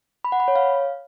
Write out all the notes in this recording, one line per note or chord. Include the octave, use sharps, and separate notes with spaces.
B5
F#5
B5
C#5
F5